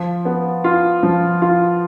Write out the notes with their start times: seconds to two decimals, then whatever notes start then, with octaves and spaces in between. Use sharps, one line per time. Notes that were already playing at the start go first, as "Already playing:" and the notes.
Already playing: F3
0.25 B3
0.64 F4
1.03 F3
1.42 F4